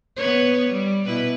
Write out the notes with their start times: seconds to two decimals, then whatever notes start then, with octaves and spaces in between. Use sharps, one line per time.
0.16 B3 B4 C#5
0.70 G3
1.06 B2 E4 B4